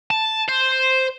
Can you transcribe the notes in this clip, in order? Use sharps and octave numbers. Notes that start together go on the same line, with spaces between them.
A5
C5